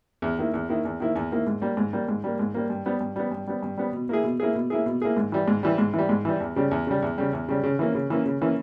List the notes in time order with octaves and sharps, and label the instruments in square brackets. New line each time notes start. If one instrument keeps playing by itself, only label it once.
[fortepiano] E2
D#3 A#3 E4
E2
D#3 A#3 E4
E2
D#3 A#3 E4
E2
D#3 A#3 E4
G#2
G3 A#3
G#2
G3 A#3
G#2
G3 A#3
G#2
G3 A#3
G2
G3 B3
G2
G3 B3
G2
G3 B3
G2
G3 B3
B2
A#3 E4 G#4
B2
A#3 E4 G#4
B2
A#3 E4 G#4
B2
A#3 E4 G#4
G#2
E3 G3
G#2
E3 G3
G#2
E3 G3
G#2
E3 G3
E2
C#3 G3
E2
C#3 G3
E2
C#3 G3
E2
C#3 G3
C#3
E3 A#3 C#4
C#3
E3 A#3 C#4
C#3
E3 A#3 C#4